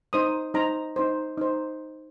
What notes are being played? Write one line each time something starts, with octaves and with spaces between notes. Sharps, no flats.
D#4 C5 D#6
D#4 C5 A#5
D#4 C5
D#4 C5